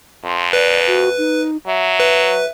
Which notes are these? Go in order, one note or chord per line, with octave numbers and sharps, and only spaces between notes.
F2 C6
B4 D5
F#4
D#4
F#3 E5
B4